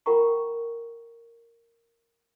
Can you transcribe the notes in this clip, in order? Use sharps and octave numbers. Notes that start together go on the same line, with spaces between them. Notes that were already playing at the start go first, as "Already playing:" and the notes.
F4 A#4 F#5 G5 A#5 C#6